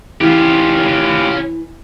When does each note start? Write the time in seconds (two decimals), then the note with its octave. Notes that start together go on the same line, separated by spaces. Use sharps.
0.21 E3 C#4 F4 G4 B4